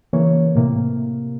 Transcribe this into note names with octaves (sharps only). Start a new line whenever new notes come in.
C#3 E3 A#3 C#5
A2 C3 A#3